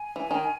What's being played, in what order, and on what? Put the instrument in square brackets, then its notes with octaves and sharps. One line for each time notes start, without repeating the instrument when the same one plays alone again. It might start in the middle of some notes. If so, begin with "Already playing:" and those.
Already playing: [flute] G#5
[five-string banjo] E3
D#3